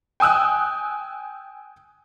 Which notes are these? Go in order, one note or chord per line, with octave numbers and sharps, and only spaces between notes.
G5 G#5 D#6 E6 F#6